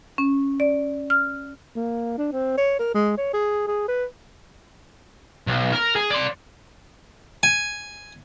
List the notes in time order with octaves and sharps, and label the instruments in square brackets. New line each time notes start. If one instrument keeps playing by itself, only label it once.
[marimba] C#4
D5
F6
[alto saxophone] A#3
D4
C4
C#5
A#4
G#3
C#5
G#4
G#4
B4
[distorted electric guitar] B1
A#4
G#4
D5 C6
[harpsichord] G#5